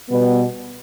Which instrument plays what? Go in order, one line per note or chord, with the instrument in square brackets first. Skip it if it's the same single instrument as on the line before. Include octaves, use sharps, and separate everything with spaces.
[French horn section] B2 G3 B3